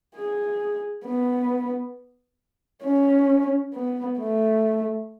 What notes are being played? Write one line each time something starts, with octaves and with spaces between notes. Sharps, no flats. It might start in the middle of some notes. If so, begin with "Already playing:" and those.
G#4
B3
C#4
B3
A3